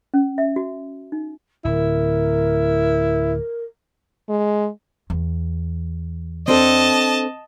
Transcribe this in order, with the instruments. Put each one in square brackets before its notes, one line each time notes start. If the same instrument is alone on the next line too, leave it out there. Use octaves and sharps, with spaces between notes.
[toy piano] C#4
E5
F#4
D#4
[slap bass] D1 [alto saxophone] E4 [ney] A#4
[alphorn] G#3
[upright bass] E2
[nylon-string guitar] C4 D4 A4 [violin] D#5 A5